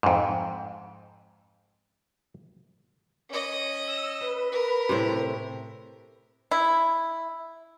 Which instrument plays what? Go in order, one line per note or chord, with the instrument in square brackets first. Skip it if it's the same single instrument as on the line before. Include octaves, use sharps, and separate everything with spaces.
[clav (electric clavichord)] F2 G#2
[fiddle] C#4 D#5
[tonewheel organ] E6
B4
[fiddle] A#4
[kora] A2 C3
[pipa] E4